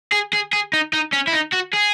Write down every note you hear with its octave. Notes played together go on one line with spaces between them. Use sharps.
G#4
G#4
G#4
D#4
D#4
C#4
E4
D#4
F#4
G#4